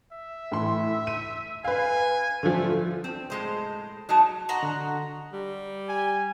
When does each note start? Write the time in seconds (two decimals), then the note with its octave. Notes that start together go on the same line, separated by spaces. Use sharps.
0.13 E5
0.52 A2 E3 C6
1.07 D#7
1.64 B4 F5 G#5
2.43 D3 F3 A3
3.04 C4
3.30 A2 G#3 C5
4.09 F#3 D#4 F#4 A5
4.49 F#4 D#5 F#5 A#5 C6
4.63 D3 C6 F#6
5.33 G3
5.89 G#5